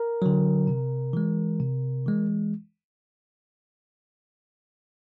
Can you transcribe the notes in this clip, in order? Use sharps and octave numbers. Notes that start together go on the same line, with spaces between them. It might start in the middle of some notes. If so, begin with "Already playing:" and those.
Already playing: A#4
D3 F#3
C3
E3 G#3
C3
E3 G#3